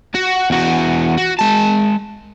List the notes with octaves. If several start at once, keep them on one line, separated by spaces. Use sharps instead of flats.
F#4
E2 F#4
F#4
G#3 A5